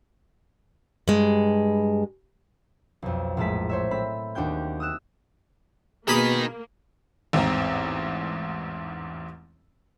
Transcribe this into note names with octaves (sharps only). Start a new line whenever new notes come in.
G2 G#3
B1 F2
A#1 A2 G#3 A3 A5 B6
C5 C#5 E5
C4 A4 B5
D#2 D4 F#4 G5 G6
D#6 E6 F#6 E7
B2 D#3 A#3 G#4 B5 D#6
A1 E2 G#2 C4 A#5